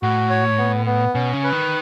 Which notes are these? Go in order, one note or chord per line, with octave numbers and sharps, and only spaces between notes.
A2 F#4
C#5
B3
B3
B2 C#4
C#3
B4
D#3